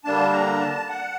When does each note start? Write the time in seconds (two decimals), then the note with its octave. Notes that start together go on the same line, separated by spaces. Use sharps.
0.05 D3 G3 A#3 D4 A5
0.33 A#5
0.60 A5
0.89 F#5